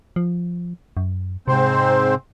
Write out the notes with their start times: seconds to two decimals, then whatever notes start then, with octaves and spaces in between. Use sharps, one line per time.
0.16 F3
0.97 F#2
1.48 G#2 C3 C4 C5